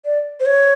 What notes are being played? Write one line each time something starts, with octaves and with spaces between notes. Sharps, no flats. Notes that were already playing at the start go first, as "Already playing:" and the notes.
D5
C5
C#5